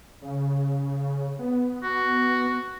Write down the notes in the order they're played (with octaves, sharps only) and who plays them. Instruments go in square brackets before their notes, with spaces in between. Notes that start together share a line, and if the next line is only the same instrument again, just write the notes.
[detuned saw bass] C#3
B3
[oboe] F#4